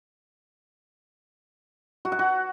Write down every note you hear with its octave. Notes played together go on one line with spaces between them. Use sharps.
F#4
F#5
F#4